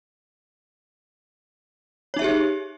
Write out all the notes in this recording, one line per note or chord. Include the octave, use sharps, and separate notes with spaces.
D#4 G4 G#4 C#5 E5